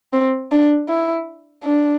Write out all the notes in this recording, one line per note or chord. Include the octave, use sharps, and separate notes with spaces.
C4
D4
E4
D4